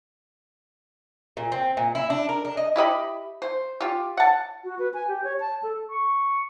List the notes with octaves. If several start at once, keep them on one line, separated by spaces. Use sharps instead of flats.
A#2
C4
A#2
E4
D4
A#4
D4
D#5
E4 G4 D#5 B5
C5
F4 G4
F#5 A5
F#4
B4
G#5
G4
C#5
A5
A4
C#6